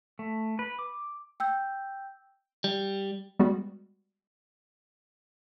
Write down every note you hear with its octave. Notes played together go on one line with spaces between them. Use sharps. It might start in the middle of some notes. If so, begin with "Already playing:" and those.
A3
B4
D6
G5 E6 G6
G3
G3 G#3 B3 F#4